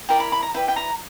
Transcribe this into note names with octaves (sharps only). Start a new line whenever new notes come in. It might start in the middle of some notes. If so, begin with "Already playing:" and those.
E4 A#4 D5 G5
B5
B5
A#5
E4 B4 D5 G5
G5
A#5